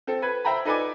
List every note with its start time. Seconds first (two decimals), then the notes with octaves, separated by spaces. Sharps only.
0.07 C4 A4
0.22 B4 G#6
0.45 C5 E5 G5 A#5 B5
0.65 D#4 A4 B4 D5 G#5 D6